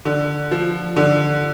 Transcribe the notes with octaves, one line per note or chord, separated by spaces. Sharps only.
D3
F3
D3